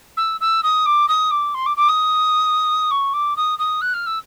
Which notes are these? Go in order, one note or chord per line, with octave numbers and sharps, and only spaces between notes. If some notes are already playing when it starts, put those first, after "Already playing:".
E6
E6
D#6
D6
D#6
D6
C6
D6
D6
D#6
C#6
D6
D#6
D#6
F#6
F6
E6